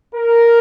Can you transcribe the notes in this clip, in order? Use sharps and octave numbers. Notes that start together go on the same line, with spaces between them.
A#4